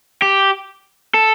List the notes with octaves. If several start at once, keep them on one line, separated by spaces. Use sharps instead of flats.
G4
A4